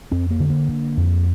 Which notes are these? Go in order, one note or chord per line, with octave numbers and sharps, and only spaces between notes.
F2 C4
A#3
D3
A#3
D3
F2